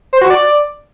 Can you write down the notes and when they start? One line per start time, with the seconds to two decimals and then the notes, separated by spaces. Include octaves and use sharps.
0.13 C5
0.21 F#4
0.30 D5